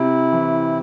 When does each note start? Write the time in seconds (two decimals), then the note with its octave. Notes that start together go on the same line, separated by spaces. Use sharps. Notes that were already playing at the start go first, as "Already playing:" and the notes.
Already playing: C3 C4 E4
0.32 E3